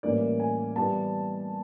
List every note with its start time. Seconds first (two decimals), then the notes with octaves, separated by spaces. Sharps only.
0.03 A2 E3 G3 A#3 C#4 D5
0.40 G#5
0.76 E3 G3 B3 A5